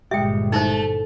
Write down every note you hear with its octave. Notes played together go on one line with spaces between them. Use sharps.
G1 A#2 G#3 G4 E5 G5
A3 D#4 E4 C5